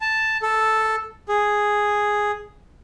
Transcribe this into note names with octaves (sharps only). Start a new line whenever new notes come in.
A5
A4
G#4